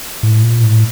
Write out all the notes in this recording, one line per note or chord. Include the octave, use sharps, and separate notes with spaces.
A2
A#2
A2